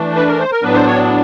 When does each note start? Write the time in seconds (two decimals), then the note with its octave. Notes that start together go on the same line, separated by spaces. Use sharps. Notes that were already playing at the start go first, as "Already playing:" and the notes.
Already playing: E3 A3 D4
0.16 B4
0.27 A#4
0.39 C5
0.51 A#4
0.62 A2 F#3 B3 D4 B4
0.74 C5
0.86 C#5